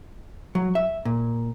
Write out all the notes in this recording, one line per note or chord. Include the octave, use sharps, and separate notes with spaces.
F#3
E5
A#2